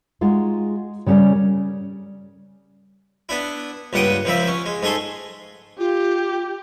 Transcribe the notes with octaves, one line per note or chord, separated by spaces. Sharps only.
G#3 D#4 F4 F#4
C#3 G3 C#4 A#4 D5
G3
B3 D4 E4
C#2 G2 A#2 F#5 G5 D#6
C#2 F3 C4 E4 E5
C#4
G#3
G#2 A3 G#4 A4 C6
F4 G4